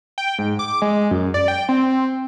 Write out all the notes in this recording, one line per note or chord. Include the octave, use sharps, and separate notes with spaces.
G5
G#2
D6
G#3
F#2
D5
G5
C4